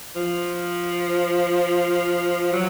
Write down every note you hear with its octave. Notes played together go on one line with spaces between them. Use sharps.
F3
F#3